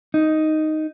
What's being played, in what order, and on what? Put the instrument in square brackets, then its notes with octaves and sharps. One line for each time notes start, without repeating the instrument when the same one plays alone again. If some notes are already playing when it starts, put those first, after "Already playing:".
[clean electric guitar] D#4